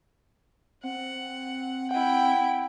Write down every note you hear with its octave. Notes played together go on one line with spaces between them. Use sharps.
C4 F#5
E4 F#5 G5